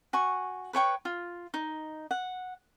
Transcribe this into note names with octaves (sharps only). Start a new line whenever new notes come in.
F#4 G#5 C#6
B4 C#5 G5 C#6
F4
D#4
F#5